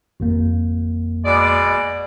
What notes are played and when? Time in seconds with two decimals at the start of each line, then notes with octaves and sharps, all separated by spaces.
0.20 G#1 F2 A#3
1.24 B2 G#3 D5